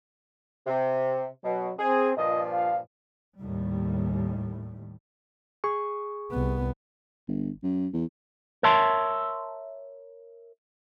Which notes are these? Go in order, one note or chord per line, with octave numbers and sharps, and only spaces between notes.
C3
B2 F#3
C4 G#4
G2 A#2 F3 D#5
F5
D#2 A2 G3
G#4 C#6
C2 B3
G1
F#2
E2
A#4 C#5 E5 A5 C6